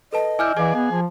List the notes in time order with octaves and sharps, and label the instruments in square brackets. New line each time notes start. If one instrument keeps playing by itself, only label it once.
[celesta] A4 B4 A5 [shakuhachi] D#5
[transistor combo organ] E4 D5 [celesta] G#5 F6 G6
[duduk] E3 [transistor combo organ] G#4 D5 [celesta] F5 D6
[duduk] B3 [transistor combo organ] G#4
[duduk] F3